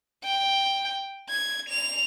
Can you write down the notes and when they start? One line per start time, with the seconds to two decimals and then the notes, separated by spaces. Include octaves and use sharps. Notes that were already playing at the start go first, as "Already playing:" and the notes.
0.24 G5
1.29 G#6
1.69 F7